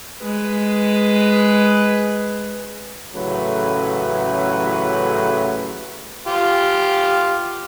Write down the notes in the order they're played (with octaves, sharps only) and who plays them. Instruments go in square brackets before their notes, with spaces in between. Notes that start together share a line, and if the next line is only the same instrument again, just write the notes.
[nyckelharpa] G#3 B4
[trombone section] A1 C#3 F#3 A3 B4
[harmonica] F4 G4